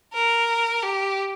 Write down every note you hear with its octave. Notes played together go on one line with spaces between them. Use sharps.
A#4
G4